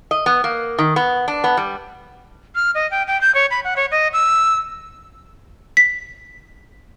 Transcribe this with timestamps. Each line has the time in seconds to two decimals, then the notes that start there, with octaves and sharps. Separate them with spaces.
0.11 D#5
0.26 B3
0.44 A#3
0.78 D#3
0.96 B3
1.28 D4
1.44 B3
1.57 G3
2.55 F6
2.75 D#5
2.91 G5
3.08 G5
3.21 G6
3.35 C#5
3.51 B5
3.64 F#5
3.76 C#5
3.91 D#5
4.13 E6
5.77 B6